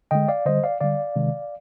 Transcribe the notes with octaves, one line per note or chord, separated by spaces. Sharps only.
D3 G#3 D#5 G5
D5 F5
D3 G3 C5 D#5
D5 F5
D3 G3 D5 F5
C3 D#3 G#3